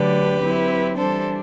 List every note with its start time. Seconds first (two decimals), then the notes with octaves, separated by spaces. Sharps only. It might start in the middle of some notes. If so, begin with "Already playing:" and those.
Already playing: D3 F#3 A3 D4 G4 B4
0.41 F#3 C4 E4
0.97 E3 G3 D4 A4 C5